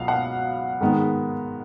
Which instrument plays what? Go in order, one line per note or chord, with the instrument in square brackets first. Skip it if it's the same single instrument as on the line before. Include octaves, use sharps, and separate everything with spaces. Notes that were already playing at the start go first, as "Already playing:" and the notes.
Already playing: [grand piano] C#2 B2 F#3 B3 F5
F#5
G#2 D#3 G#3 B3